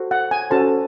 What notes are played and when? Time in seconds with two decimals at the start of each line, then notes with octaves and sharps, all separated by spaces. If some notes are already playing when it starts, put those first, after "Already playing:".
Already playing: F#4 A4 C5
0.11 F#5
0.31 G#5
0.50 C#4 F#4 A4 C5 A5